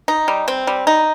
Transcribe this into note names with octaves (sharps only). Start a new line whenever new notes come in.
D#4
G3
C4
G3
D#4